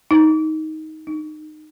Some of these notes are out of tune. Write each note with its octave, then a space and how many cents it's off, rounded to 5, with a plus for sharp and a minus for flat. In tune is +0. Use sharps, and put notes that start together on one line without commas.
D#4 +15
D#4 -20